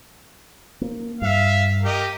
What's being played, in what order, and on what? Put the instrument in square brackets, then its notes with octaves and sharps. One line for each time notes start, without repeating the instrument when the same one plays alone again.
[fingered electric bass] A#3
[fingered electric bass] G2 [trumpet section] E5 F5
[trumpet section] G4 A#4 D#5